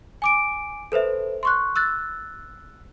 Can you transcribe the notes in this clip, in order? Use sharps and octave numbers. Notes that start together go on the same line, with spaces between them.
G#5 D6 D7
A4 B4 C5 E5
C6 C#6 F#6
E6 F#6 A6